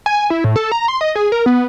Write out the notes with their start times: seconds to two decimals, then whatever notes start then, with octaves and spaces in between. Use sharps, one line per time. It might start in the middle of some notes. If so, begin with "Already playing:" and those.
0.06 G#5
0.30 E4
0.44 A2
0.56 A4
0.72 A#5
0.88 C6
1.01 D#5
1.15 G#4
1.32 A#4
1.46 B3